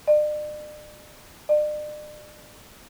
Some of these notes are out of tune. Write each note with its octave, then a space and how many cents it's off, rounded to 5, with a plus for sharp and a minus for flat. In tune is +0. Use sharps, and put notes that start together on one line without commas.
D5 +40
D5 +40